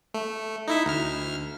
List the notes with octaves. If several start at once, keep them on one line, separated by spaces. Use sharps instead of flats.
A3
D#4 E4 E5
D2 F6